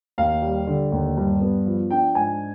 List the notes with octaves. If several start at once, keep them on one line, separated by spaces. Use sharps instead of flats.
D#2 F5
G3
D3
D#2
G2
B3
F3
D4 G5
G#2 G#5